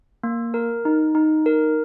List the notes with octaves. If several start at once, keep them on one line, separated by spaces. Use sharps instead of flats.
A#3
A#4
D#4
D#4
A#4